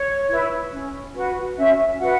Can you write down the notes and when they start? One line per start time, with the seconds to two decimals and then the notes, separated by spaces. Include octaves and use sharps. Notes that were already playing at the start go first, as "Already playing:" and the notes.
Already playing: C#5
0.30 E4 B4
0.73 C#4
1.15 F#4 B4
1.58 C#4 E5
2.00 F#4 B4 F#5